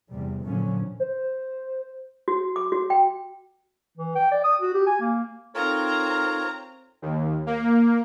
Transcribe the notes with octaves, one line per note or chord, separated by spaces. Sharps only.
E2 C3 G3
F#2 A#2 D3 F3 F#3 C#4
C5
F#4
D6
F#4
G5
E3
G5
D5
D#6
F#4
G4
G#5
A#3
C4 D#4 F4 A4 A#4 C#5 A#5
D#2
A#3